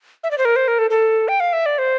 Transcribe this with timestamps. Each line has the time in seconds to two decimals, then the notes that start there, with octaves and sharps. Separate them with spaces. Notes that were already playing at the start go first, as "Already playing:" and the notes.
0.24 E5
0.31 D5
0.38 C5
0.45 A#4
0.56 C5
0.68 A#4
0.79 A4
0.90 A4
1.28 G5
1.40 F5
1.53 E5
1.66 D5
1.78 C5